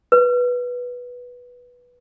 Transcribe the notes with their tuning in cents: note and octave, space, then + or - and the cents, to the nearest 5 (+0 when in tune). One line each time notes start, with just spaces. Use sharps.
B4 -10